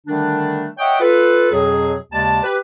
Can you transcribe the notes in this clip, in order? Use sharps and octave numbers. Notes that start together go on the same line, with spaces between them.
D3 D#3 G3 A3 D4
C#5 D#5 E5 F#5 G5
F4 A4 B4
F2 B2 F#3 G#4
D#2 C#3 G#3 D5 A5
G4 B4